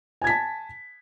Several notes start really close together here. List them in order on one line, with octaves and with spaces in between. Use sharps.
G#5 G#6 B6 A5